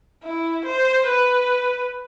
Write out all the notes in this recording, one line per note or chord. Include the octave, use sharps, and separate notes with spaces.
E4
C5
B4